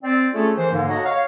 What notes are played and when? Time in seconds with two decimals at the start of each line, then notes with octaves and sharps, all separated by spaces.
0.03 C4 D5
0.33 A3 C#4 F4 G#4 A4
0.56 D#3 E3 C5
0.70 G#2 D3 A#3
0.88 F#4 A4 C#5 D#5 F#5 A#5
1.05 C#5 F5